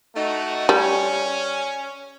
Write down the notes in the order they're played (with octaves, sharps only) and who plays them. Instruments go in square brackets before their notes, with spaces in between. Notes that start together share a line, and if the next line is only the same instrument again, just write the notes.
[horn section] A3 D#4 F#4
[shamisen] G3 [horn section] C#4